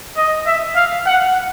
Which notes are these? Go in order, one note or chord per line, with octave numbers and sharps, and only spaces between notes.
D#5
E5
F5
F#5